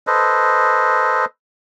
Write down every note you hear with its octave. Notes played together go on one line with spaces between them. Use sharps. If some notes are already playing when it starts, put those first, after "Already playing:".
A4 B4 C5 D#5